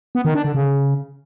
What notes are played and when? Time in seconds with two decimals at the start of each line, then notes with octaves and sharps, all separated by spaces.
0.15 B3
0.25 D#3
0.35 D4
0.45 D3
0.55 C#3